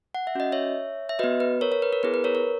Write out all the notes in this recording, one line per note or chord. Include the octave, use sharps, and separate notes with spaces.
F#5
E5
C#4 F#4 D#5
C#5 E5
E5
B3 F#4 B4 D#5
B4
A#4 C#5
A#4 C#5
B4
A#4
B3 E4 G#4 B4
B4
A#4 C#5
A#4 C#5